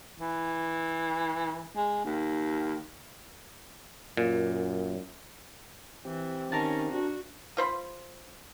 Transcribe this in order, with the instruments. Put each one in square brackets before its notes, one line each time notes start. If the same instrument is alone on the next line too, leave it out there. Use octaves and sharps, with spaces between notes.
[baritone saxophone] E3
G#3
D#2
[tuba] F#2 [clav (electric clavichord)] A#2
[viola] E3 [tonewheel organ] C4 G4
[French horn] D#3 [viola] C#4 [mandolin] A#4 F5 A5
[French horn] D4 [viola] F#4
[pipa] F4 C5 B5